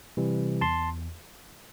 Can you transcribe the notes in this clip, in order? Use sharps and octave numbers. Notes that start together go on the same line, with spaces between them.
C3 E3 G3
E2 A5 C6